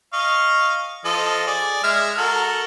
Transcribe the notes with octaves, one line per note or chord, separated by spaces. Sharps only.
D#5 F5 C#6
F3 A4 D#5
G#4 D5
G#3 E5 F6
F#4 A4 A#4